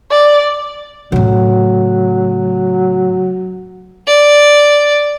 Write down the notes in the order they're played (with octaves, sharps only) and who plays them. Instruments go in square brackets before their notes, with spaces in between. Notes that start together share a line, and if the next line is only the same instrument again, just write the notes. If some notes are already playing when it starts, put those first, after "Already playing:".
[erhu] D5
[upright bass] A2 C#3 [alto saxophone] F#3
[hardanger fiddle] D5